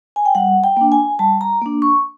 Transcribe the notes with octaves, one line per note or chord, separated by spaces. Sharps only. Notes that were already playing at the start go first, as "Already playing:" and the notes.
G#5
G5
G3 F#5
G5
A#3 D4
G#5
G3 A5
A#5
A#3 D4
C#6